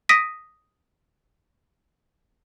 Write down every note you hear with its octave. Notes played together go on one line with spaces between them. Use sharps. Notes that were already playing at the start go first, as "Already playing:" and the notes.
D#6 A#6 B6 D7 D#7